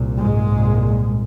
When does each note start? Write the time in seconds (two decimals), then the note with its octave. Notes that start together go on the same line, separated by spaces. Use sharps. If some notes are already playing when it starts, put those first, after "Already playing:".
Already playing: C2 A#2
0.19 G#2 G#3
0.49 C2 A#2